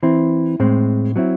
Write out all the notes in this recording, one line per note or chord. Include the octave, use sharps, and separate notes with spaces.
E3 C4 E4
A2 G#3 C4
F#3 C4 E4